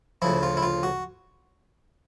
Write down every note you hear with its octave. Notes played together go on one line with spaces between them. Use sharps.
D2 C#3 F3 E4
F4
E4
F4
F#4